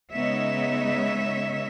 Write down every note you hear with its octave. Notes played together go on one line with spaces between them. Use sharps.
C#3 G#3 B3 D#4 C#5 E5